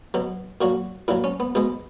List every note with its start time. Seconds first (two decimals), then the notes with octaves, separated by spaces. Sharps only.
0.14 B2 F#3
0.61 A#2 F#3 F#4
1.08 A#2 F#3 E4
1.24 C#4
1.40 B3
1.55 B2 G#3 B3